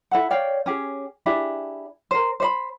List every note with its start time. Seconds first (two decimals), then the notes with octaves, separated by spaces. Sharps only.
0.11 E4 A4 F#5
0.31 C#5 D5 F5 G5
0.66 C#4 G4 G#4
1.26 D4 E4 G4 G#4
2.11 A#4 C5
2.40 C5 D5 B5